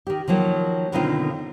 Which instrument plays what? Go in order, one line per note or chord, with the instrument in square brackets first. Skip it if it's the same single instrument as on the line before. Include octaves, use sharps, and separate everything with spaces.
[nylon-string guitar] D#3 G4
D#3 F3 F#3 A#3
B2 D3 D#3 C4 D#4 F4